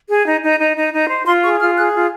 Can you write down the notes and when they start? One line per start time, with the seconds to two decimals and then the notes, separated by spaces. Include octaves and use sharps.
0.09 G#4
0.26 D#4
0.42 D#4
0.59 D#4
0.77 D#4
0.93 D#4
1.09 C5
1.26 F4 C6
1.43 G#4 C#6
1.60 F4 F6
1.77 G#4 F#6
1.93 F4